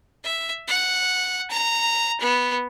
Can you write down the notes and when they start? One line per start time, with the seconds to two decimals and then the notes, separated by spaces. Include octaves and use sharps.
0.24 E5
0.68 F#5
1.51 A#5
2.21 B3